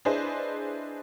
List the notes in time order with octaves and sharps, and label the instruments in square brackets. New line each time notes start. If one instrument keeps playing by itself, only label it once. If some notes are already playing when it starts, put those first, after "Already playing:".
[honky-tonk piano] D4 E4 G#4 B4 C5 D#5